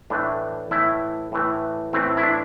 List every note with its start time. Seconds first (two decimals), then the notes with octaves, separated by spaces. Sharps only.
0.10 A2 E3 A3 D4
0.71 A2 E3 A3 E4
1.32 A2 E3 A3
1.93 A2 E3 A3 C4
2.17 E4
2.23 D4